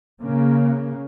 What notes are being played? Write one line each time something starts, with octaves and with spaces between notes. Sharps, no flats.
C#3 A#3